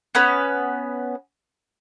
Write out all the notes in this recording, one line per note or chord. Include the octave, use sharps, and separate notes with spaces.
B3 C#4 B4